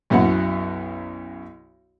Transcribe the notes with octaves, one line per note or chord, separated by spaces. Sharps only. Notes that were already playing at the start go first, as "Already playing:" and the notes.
B1 F#2 B3 E4 F#5